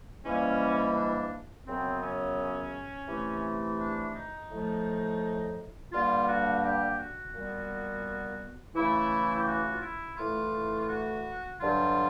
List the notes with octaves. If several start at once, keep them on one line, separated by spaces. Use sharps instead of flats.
G#2 E3 G3 A#3 C#4
D4
F#2 C#3 F#3 B3 C4
C#4
C3 E3 A3
D4
D#4
A2 F3 A3
G2 D3 G3 A#3 F4
F#4
F#4
G4
F#4
A#2 G3 B3
C#3 E3 A3 E4
G4
F#4
F4
E4
A2 E3 A3 F4
F4
F#4
G2 D3 F#3 F4